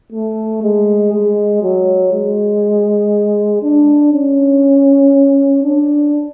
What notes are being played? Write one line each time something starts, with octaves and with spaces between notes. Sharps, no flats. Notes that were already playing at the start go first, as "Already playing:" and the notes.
A3
G#3
G#3
F#3
G#3
D4
C#4
D4